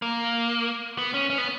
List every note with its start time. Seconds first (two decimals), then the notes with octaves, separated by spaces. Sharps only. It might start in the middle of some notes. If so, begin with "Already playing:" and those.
0.02 A#3
0.98 B3
1.14 C#4
1.30 C#4
1.38 B3